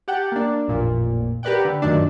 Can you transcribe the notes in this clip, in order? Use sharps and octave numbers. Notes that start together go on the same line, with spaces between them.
G4 F#5 G5 A5
A#3 D4
A1 F2 A#2
G4 A#4 B4 D5 F#5 G5
D3
F#2 A#2 D#3 F#3 A3 D4